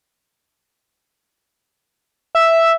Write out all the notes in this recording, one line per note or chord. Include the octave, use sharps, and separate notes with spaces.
E5